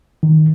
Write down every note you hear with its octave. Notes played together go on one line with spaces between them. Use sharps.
D#3